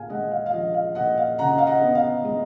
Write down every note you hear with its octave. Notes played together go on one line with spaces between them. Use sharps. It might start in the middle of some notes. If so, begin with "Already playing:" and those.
Already playing: A#2 F5 G#5
G#3 D#5 F#5
F5
F5
F3 D#5
F5
A#2 D#5 F#5
F5
C#3 F#5 A#5
D#5
F5
D#5 F#5
B3
F5
G#3 D#5